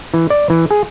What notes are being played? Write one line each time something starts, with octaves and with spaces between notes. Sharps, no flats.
E3
D5
E3
G#4